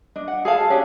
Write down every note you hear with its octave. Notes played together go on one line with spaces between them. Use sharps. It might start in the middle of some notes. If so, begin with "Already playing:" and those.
D4 D#5
F#5
G#4 A4 F5 A5
C#4 D4 G4